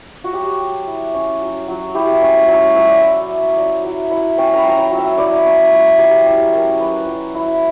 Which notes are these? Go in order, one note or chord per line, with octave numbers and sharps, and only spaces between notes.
F#4
F#3 G4
F#3
E4
C#4
F#3
F#3
E4 G4
C#4
F#3
F#3 E5
D5
E4 E5
C#4
F#3 D5
F#3 E5
E4 F#5
C#4 G5
A#5 B5
F#3
A#5
G5
F#3
E5
E4 D5
C#4
F#3
F#3 G4
E4 G4
C#4 A#4
F#3 B4
F#3
E4